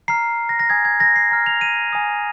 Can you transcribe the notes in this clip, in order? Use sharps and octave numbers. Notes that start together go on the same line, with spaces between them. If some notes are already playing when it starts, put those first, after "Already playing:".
A#5 F6 C7
A#6
A#6
G#5 D#6 G#6
G#6
A#6
C7
A#5 F6
F7
D#7
G#5 D#6